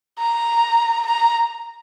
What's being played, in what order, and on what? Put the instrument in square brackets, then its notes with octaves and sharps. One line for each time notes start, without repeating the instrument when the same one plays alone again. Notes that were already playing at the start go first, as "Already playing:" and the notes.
[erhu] A#5
A#5